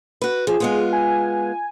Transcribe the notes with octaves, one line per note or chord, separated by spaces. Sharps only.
F#4 B4
F3 G#4
G#3 B3 F4
G#5